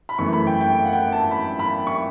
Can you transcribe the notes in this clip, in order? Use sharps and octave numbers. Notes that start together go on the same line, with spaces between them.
B5
F#2 E3 A3 C#6
B5
G5
G5
F#5
G5
A5
B5
B5
C#6